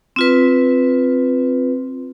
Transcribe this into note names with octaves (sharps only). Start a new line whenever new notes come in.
C4 F4 B4